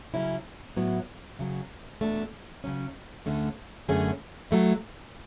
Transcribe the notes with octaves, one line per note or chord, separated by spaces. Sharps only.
C#3 F#3 C#4 E4
A2 F#3 B3 E4
F#2 C#3 F#3
E2 B2 A3 D4
C#3 F#3 C#4
D2 D3 A3 C#4
F#2 D3 A3 C#4 G#4
F#3 A3 E4